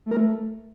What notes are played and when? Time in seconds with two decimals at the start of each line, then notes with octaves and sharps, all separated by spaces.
0.06 A3
0.11 A#4
0.17 A3